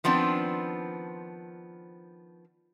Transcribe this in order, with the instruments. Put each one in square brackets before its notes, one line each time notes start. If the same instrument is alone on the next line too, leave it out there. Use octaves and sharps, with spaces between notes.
[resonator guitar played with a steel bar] D#3 F3 B3 C4 D4